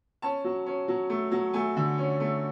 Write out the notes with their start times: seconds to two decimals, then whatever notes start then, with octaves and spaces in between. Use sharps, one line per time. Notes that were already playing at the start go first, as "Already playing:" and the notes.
0.22 C#4 A5
0.44 F#3
0.66 C#4
0.88 F#3
1.10 A3
1.32 F#3
1.53 A3 G#5
1.77 D3
1.98 C#4
2.20 A3